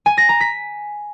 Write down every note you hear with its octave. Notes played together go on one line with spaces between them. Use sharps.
G#5
A#6
A#5
B6